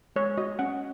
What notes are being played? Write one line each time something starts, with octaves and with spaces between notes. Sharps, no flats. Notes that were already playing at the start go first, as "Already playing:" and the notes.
G#3 C#5
F#4 D#5
C#4 F#5